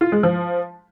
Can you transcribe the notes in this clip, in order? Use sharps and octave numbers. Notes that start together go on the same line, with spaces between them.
F4
G#3
F3